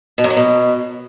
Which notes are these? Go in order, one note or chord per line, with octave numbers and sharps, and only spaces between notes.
B2
F#2
F#3
B2